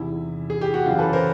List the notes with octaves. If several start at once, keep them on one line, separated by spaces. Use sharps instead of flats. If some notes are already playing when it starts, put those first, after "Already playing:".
Already playing: E2 C3 D#3 E4
G#4
G4
F#4
F#2 C#3 E3 F4
A4 B4
A#4 C5